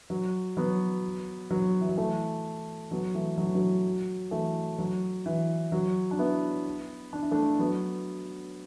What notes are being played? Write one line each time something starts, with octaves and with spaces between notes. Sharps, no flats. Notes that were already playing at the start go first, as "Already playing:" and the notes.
F#3
F#3 B3
F#3
E3
F#3
E3 A3
F#3 B3
E3 A3
F#3
E3
F#3
E3 A3
F#3
E3
F#3
D4
B3 E4
D4
E4
A3 D4
F#3 B3